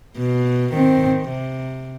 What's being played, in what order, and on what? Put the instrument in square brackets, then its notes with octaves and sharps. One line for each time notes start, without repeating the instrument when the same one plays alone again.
[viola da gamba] B2
[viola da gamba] D#3 [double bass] C4
[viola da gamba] C3